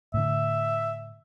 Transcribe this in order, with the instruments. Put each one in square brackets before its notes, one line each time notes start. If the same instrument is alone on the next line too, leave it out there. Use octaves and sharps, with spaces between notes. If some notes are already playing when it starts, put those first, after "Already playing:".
[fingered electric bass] A2 D3 [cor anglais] E5